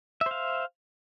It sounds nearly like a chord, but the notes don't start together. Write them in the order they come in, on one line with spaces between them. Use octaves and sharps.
E5 C5 F5